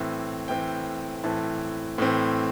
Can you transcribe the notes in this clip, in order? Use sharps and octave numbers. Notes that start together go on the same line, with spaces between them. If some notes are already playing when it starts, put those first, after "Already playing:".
Already playing: A2 E3 C4 E5
A2 E3 C4 G5
A2 E3 C4 A5
A2 E3 C4